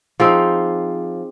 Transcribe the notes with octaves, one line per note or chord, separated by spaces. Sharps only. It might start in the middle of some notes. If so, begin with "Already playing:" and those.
F3 C4 D#4 G#4